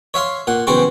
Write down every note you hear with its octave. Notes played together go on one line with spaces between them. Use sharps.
C#5 E5 F5 C6
A#2 F#5
B1 C#3 E3 C5 G5 C#6